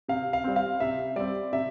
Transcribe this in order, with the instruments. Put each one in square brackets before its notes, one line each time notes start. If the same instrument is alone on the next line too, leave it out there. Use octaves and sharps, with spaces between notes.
[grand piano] C3 F5
F5
G3 C4
F5
C3 E5
G3 C4 D5
C3 E5